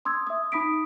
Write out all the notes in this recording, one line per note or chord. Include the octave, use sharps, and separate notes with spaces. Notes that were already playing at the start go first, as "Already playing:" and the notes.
C6 D#6 E6 G#6
E5 D#6
D#4 B5 D#6 B6 D7